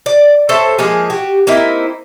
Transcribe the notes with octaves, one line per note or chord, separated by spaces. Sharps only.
D5
A4 C5 C#5 E5
F3 G#3 A#3 G#4
F#4 G4
A#3 C4 D#4 E4